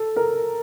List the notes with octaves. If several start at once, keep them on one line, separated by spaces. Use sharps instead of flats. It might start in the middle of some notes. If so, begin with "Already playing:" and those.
Already playing: A4
A#4